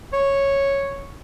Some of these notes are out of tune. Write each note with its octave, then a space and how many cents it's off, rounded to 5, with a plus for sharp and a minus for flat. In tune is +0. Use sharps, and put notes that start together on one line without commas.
C#5 -5